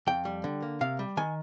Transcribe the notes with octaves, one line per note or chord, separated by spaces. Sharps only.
F2 G5
G3
D3
A#3
C3 F5
G3
D#3 G#5